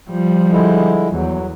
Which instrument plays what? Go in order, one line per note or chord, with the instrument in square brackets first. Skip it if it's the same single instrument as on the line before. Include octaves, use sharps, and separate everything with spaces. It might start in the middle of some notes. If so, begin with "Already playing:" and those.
[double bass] F3 G3
[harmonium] D3 G#3 E4
[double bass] E2 [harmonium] F#3